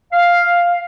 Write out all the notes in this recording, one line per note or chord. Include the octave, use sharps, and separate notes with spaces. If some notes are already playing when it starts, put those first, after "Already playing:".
F5